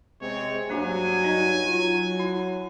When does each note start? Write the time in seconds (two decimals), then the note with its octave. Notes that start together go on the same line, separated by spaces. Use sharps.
0.21 C3 G#3 C4 C#5
0.69 G2 F#3 A#3 D4 G4 G#5
1.23 D#4 D#5
1.66 F#3 F4
2.20 E4